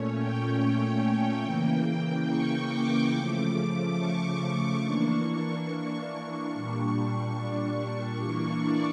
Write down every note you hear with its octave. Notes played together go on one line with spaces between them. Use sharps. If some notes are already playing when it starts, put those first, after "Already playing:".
Already playing: A#2 A3 C#4 C#5
G5
G5
C#3 E3 A#3
C#6
D6
C#3 F3 A3
C#6
E3 A#3 D4
A#2 G3 D4 C#6
E3 A#3 D4 C#6
D5